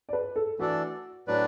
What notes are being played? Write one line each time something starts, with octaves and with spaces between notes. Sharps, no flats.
D5
B4
A4
E3 A3 D4 F#4 A4 D5
A2 F#3 D4 F#4 B4 D5